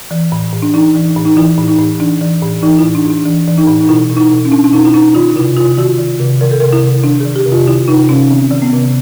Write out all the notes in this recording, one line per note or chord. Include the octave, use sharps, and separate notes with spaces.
E3
A2
A2
D4
E3 D#4
E3
A2
D#4
E3 E4
A2
D#4
A2
E3 D4
E3
A2
E3 D#4
A2 E4
D4
A2 D4
E3 D4
E3
D#4
A2
D#4
B2 E4
B2
D#4
E4
B2
C#4
B2 D4
D4
B2 D#4
E4
B2 D#4
D#3 F4
C3 E4
C3 F4
D#3 F#4
D#3
C3
D#3 A#4
A4
C3 A#4
E4
C3
D#3 D4
D#3 G#4
G4
C3
F4
D#3 E4
C3 D#4
C3 C#4
D#3 C4
D#3
B3
C3